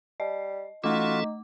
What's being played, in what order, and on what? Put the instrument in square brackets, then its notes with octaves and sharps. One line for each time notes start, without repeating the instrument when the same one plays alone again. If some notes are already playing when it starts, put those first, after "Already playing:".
[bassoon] G3 [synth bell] D#5
[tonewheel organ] E3 C#4 A4 [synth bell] A3 D6 [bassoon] D#4 [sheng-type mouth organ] F4 F#4